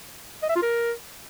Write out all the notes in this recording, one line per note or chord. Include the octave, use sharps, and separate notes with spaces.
D#5
E5
F4
A#4